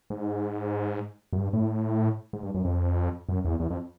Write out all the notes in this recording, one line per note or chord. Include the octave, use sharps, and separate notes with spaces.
G#2
F#2
G2
A2
G#2
G2
F#2
F2
F#2
E2
E2
F2